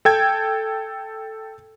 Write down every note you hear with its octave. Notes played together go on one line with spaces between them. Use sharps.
A4 G5 G#6